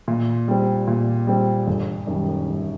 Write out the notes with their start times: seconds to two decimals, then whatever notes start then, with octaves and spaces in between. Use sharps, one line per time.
0.08 A#2
0.48 G3 C4
0.88 A#2
1.27 G3 C4
1.67 G1
2.07 F#2 D#3 G3
2.47 G1